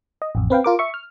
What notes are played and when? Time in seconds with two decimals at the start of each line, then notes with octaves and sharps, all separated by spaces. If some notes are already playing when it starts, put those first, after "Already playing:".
0.22 D#5
0.35 A1 F2
0.50 C4 B4 F5 G5
0.64 F4 A#4 D6
0.79 E5 C#6
0.94 F6